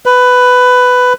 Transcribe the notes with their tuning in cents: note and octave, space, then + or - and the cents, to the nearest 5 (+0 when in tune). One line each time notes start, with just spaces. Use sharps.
B4 +10